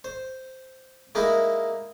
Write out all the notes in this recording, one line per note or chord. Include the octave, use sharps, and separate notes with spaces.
C5
G#3 A#3 D#4 E4